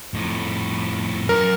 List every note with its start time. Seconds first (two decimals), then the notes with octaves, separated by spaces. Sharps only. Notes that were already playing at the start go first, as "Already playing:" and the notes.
0.14 F2 A2
1.29 F#2 A#4